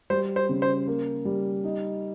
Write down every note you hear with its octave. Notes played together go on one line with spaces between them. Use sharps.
G3 C5
C5
C#3
C5
A#3
G3
D#4